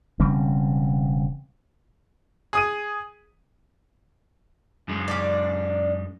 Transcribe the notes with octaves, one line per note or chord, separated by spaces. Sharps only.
E1 C#3 G3 C4
G#4 D#6 D#7
F#2 G#3
C#4 D4 D5